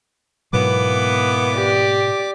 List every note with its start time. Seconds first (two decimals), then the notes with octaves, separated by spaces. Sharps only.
0.53 G#2 B2 E3 F#3 A#3 B3 D6
1.55 G4 D5